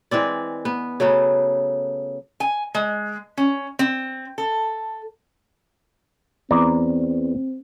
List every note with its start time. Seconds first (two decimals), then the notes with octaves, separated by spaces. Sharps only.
0.11 E3 G#3 C4 D5
0.65 B3
1.00 C#3 F#3 A3 B3
2.40 G#5
2.75 G#3
3.37 C#4
3.79 C4
4.38 A4
6.51 E2 C4 D5 A#5